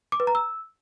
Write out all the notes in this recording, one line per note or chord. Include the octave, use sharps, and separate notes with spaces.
D6
B4
A#5
E6